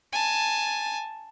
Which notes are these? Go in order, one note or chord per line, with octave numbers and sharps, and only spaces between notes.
G#5 A5